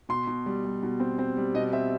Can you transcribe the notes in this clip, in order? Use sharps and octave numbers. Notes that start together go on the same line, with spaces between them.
B2 C6
B2
G3
G3
B2
C4
C4
G3
B2 D#5
C4 E5